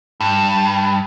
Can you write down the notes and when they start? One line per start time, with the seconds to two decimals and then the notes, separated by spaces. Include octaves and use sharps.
0.20 G2